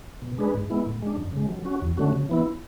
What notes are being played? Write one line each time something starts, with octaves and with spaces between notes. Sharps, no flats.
B2
G#3 D4 G#4 B4
G#2
G#3 B3 E4
A2
G#3 D4
F#2
C#3 G#3
F#3
C#4 F#4
E2
D3 A3 C#4 F#4
C#3
E3 B3 E4